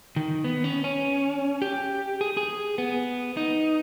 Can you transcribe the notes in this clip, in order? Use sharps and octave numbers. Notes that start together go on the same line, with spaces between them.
D#3
B3
C#4
C#4
G4
G#4
G#4
B3
D#4